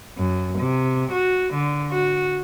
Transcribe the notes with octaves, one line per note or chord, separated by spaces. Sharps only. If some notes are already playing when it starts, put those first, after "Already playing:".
F#2
C3
F#4
D3
F#4